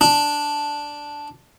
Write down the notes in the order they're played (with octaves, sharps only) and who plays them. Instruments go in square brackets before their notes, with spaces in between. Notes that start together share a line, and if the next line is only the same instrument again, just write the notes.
[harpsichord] D4